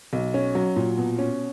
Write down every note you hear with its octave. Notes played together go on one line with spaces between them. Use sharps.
B1
C#4
F#3
A#2
B2
C#4